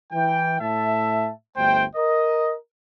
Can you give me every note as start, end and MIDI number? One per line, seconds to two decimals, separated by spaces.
0.12 0.60 52
0.12 0.60 79
0.61 1.30 45
0.61 1.30 76
0.61 1.30 81
1.57 1.85 31
1.57 1.85 38
1.57 1.85 57
1.57 1.85 72
1.57 1.85 79
1.96 2.54 70
1.96 2.54 75